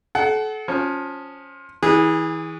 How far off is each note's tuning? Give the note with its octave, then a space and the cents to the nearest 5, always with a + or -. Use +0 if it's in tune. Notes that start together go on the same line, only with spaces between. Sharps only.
A4 -35 F#5 +25
F3 +20 C#4 +5
E3 -30 G#4 -15